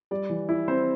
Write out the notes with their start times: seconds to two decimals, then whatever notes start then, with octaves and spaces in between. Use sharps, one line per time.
0.11 G3 D5
0.30 E3
0.49 E4
0.68 C4 C5